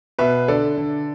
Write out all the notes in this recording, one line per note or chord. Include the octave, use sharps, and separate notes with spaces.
B2 B4 E5
D3 A4 D5
D3